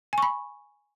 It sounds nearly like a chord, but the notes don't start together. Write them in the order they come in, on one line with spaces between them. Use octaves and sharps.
G#5 C#6 B5